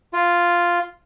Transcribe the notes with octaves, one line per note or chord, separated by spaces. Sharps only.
F4